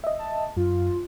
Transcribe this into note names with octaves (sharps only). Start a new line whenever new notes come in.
D#5 E5
A5
F#2 F4